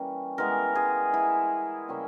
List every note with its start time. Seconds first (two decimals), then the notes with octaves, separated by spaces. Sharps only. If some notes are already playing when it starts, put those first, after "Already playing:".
Already playing: E3 G3 A#3 C#4
0.38 E3 G#3 B3 A#4
0.75 G#4
1.14 E4
1.88 C#3 G3 A#3 C#4